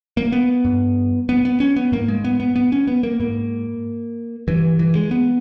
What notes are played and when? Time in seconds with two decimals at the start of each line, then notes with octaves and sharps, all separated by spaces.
0.17 A#3
0.32 B3
0.65 G2
1.29 B3
1.45 B3
1.60 C#4
1.76 B3
1.92 G#2 A#3
2.08 G#3
2.24 B3
2.40 B3
2.56 B3
2.72 C#4
2.87 B3
3.03 A#3
3.20 G#2 A#3
4.48 G2 E3
4.79 E3
4.95 G#3
5.11 B3